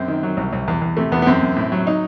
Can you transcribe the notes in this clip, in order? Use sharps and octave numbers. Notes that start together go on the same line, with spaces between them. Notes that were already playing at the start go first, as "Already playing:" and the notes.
Already playing: F#2 C4
D#3
F#3
C2
C2
E2
E2
C3 A3
E2 B3
B3
F#2 C4
F#2
A2
F#3
D#4